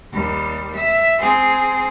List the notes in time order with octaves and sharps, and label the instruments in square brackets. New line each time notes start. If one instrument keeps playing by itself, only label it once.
[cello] D#2 G3
E5
C4 G#4